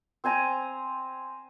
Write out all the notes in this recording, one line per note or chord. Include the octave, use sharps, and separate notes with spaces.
C4 C5 G#5 A#5